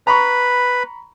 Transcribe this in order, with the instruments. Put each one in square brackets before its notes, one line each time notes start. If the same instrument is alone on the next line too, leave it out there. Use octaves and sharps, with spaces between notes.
[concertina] B4 [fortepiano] A#5 B5 C#6